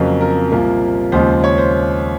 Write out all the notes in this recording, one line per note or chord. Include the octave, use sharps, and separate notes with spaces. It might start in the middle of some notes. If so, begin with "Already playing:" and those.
Already playing: F2 C#3 F#3 A#3
A#4
C2 A#2 F3 A#3
D#2 C#3 F3 G#3 C5
C#5
C5